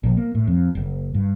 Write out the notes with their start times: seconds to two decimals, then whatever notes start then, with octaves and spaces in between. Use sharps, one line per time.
0.04 A#1
0.17 A#3
0.35 A2
0.47 F2
0.75 F#1
1.14 G2